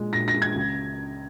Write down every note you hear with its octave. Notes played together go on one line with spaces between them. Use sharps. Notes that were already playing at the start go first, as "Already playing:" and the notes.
Already playing: A#2 G#3
A#2 A#6
A#6
G#3
G#6
C#2